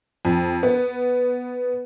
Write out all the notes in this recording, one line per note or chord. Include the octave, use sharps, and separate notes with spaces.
F2
B3